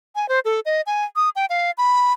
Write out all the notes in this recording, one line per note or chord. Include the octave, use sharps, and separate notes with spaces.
G#5
C5
A4
D#5
G#5
D#6
G5
F5
B5